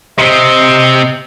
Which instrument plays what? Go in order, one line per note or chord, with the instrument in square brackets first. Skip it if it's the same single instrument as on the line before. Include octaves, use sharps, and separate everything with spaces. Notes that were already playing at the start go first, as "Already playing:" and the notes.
[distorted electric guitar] C3 C4 [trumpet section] D#5